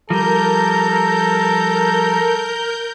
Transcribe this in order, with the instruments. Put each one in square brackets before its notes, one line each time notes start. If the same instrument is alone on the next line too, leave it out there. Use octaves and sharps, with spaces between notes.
[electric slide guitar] F3 G3 [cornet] A4 [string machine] A#4 G6 [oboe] A#5